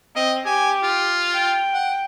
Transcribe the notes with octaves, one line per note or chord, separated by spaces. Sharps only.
C4 D#5
G4 G#5
F4
G5
F#5